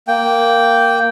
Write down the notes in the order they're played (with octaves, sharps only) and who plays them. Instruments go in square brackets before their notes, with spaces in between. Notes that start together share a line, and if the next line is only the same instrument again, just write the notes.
[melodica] A#3 G5